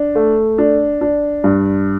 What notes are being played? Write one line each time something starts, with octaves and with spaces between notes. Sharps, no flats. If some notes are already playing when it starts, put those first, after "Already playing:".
Already playing: D4
A3
D4
D4
G2